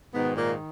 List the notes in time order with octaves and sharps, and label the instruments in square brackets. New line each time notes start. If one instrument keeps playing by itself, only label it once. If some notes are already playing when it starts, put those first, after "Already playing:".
[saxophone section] G#2 B2 D#3 B3
A#2 A#3